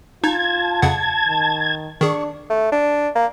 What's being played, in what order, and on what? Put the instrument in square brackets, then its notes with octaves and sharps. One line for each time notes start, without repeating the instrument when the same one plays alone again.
[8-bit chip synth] D#4 [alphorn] F4 [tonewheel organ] A5 G#6
[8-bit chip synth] F2 C#3 F#5
[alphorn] D#3
[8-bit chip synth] D#3 G#4 [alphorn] D4 [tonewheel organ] C#6
[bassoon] A3
D4
A#3